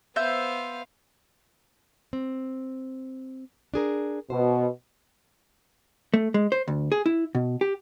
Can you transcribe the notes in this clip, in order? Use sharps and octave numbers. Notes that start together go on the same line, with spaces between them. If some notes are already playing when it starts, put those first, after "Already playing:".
B3 C5 E5 F5 G6
C4
D4 G#4 A#4
B2 C5
A3
G#3
C5
D2
G#4
E4
B2
G4